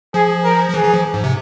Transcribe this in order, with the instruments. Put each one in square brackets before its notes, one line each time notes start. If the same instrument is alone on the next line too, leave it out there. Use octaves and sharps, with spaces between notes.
[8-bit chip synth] F3 [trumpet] G#4
[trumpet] A#4
[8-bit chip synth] F3
[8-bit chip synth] E3 [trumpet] G#4
[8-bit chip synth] E3
F3
G#2
C3